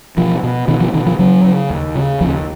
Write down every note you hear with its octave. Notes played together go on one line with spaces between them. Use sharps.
B2 F3
B2
B2 D#3
F3
B2 D#3
F3
C#3 F#3
C#3
D#2
C#3
D#2 F3